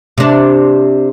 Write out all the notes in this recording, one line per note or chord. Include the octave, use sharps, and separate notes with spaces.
C3 D4